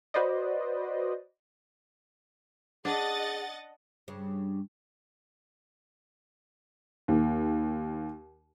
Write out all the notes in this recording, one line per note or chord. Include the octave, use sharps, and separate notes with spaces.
F#4 B4 C5 D5 D#5
D4 G#4 D#5 F#5 A6
G2 C#3
D#2